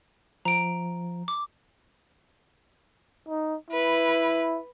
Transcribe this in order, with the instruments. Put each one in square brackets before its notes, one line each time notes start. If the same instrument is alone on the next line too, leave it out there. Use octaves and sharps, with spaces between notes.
[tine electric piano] F3 [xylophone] A#5 D7
[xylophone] D6
[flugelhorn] D#4
[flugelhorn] E4 [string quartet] B4